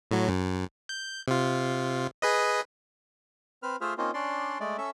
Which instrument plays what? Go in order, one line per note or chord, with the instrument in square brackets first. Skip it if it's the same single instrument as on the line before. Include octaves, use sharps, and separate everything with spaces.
[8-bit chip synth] A2 F#3
F#2
G6
C3 F4
G#4 B4 D#5
[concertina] C4 B4 F6
A3 F4 G#4 C5 E5 F6
A#3 C4 C#4 D#4 F4
C#4 D4 D5 C6
G#3 A3 D5
C#4 A4 E5